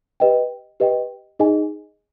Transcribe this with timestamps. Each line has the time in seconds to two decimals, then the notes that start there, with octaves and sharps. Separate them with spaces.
0.20 G4 B4 D#5 G5
0.80 G4 B4 D#5 G5
1.39 D#4 G#4 D#5 G#5